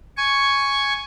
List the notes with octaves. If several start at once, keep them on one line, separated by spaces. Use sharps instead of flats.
G#5 C#6